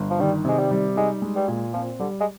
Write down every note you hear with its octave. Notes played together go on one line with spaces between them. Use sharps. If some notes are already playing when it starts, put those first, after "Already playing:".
Already playing: G1
F3
D#3 G3
C3 G#3
G3
G3
G#3 D#4
G#3
G3
A#2
F3 C4
D3 G3
G#3